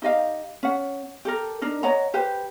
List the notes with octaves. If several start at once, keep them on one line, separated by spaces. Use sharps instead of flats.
D#4 G4 D#5 F5
C#4 F#5
G4 A4 A#4
D4 D#4 A#4
C#5 D#5 F#5 A#5
G4 B4 C5 G5